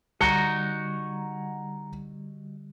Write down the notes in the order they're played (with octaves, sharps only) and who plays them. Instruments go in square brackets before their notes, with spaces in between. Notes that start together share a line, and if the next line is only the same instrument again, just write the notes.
[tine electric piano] D3 G3 G#6 [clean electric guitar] D#4 F#4 [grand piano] A#5 C#7 G7